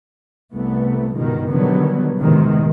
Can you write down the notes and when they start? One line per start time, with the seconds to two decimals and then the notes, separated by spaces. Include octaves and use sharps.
0.53 C2 A3 B3
1.15 C#2 G2 B2 D#3
1.50 B2 D3 D#3 F#3 G3 B3
2.19 A#1 E2 A2 C3 D#3 G#3